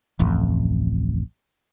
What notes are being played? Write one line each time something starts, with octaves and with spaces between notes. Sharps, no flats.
D1 A1 F2